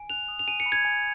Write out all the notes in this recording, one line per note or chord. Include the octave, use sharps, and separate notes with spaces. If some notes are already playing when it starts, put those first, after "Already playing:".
Already playing: G#5
F#6 F7
D#6
F7
G#5 D#7
C#7
B5
G#6
G#5